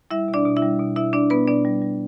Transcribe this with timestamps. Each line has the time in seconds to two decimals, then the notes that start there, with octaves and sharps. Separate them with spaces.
0.11 G3 E4 E5
0.28 B2
0.34 D4 D5
0.45 B2
0.56 E4 E5
0.62 G3
0.79 B2
0.96 B2 E4 E5
1.13 B2 D4 D5
1.30 B2 B3 B4
1.47 B2 D4 D5
1.65 G3
1.82 G3